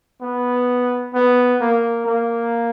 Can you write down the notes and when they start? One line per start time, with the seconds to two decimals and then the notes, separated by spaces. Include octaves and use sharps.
0.21 B3
1.14 B3
1.61 A#3
2.06 A#3